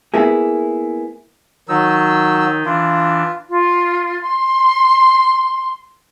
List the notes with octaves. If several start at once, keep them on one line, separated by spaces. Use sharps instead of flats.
A#3 B3 E4 G#4
D#3 F#3 D#4 E6
E3 D4 F4
F4
C6